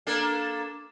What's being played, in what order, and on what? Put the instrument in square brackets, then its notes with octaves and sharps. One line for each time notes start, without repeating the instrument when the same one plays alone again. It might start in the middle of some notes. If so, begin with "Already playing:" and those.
[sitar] A#3 D4 A4